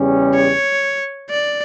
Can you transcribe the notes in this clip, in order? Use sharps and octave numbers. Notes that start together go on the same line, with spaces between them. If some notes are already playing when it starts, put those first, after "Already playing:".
Already playing: E2 C#3 G3 C#4
C#5
D5